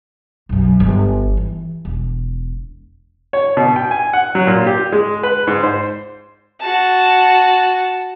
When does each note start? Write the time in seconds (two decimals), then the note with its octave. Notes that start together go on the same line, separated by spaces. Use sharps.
0.49 B1 F#2
0.80 G1
1.37 E3
1.85 E1
3.33 C#5
3.57 B2
3.76 G5
3.91 G#5
4.13 F#5
4.35 F#3
4.47 A#2
4.66 G4
4.92 G#3
5.23 B4
5.47 G#2
5.63 C5
6.61 F#4 A5